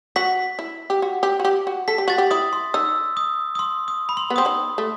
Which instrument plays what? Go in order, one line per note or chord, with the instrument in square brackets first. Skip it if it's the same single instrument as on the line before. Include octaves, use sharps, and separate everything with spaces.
[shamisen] F#4 [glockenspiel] B6
[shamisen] E4
G4
F#4
G4
F#4
G4
F#4
[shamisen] A4 [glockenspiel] B6
[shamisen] G4
[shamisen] F#4 [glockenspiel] A6
[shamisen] G4
[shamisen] E4 [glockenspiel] D#6
[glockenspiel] C6
[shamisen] D#4 [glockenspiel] E6
[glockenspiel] D#6
D#6
C6
D#6
B5
C6
[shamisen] B3
[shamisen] C4 [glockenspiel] D#6
[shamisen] D#4 [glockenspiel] C6
[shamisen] A3